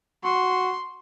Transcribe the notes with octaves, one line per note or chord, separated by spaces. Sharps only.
F#4 C6